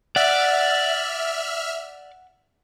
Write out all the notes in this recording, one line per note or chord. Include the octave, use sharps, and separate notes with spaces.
D5 E5 F#5 F6